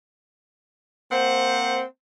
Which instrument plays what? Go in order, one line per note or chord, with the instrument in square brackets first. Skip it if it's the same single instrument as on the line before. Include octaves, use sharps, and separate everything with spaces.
[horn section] A#3 C4 C5 F#5